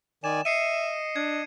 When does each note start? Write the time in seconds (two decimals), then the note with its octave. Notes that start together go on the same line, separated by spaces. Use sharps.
0.24 D#3 D5 G#5 E7
0.45 D#5 E5 C7 C#7 D#7
1.16 D4 G#6